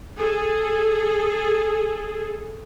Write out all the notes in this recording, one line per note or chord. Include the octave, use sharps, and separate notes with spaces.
G#4 A4